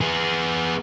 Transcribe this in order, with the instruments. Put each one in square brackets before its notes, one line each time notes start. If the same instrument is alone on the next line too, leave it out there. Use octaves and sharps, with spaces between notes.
[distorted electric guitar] B3 G#4